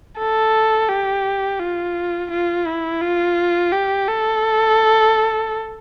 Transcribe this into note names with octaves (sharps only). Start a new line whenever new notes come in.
A4
G4
F4
F4
E4
F4
G4
A4